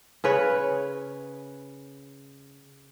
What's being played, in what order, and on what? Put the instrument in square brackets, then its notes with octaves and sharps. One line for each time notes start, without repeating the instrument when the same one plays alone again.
[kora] C#3 B4 C#5